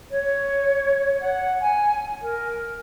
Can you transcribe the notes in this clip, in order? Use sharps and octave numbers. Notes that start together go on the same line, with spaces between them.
C#5
F#5
G#5
A#4